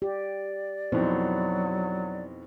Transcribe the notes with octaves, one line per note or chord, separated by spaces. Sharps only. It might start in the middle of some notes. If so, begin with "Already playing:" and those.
G4 D5
F2 B2 F#3 D#4 E4 C5